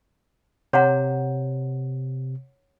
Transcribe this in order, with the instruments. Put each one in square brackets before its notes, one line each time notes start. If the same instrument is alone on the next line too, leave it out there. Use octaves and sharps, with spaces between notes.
[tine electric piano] C3 [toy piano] C#5 F#5 A#5